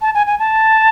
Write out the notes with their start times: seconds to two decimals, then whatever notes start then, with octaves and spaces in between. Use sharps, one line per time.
0.02 A5
0.14 G#5
0.27 G#5
0.39 A5